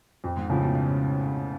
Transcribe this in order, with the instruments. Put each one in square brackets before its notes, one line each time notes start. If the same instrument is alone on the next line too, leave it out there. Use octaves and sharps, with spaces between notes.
[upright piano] F2
[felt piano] G#2
[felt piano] A2 [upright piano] C#3 F3
[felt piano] B2
C#3